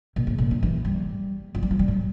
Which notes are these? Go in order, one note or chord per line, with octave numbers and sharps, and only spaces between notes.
A#2
A2
A#2
D3
E3
G3
F3
G3
F3
G3
A2